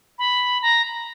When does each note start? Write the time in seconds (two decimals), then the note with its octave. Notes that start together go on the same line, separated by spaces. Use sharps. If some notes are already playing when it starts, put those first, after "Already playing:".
0.19 B5
0.62 A#5